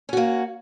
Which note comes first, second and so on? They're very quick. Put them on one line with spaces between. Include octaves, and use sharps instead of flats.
C#4 F#4 A#3